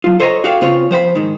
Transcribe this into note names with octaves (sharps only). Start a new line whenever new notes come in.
F#3 F4
A4 C5 C#5 D#5 F#5 A#5
F#4 G#4 A4 D5 F5 G5
C#3 B3 C4 F4 C#5
F3 C5 F#5 B5
G#2 D#3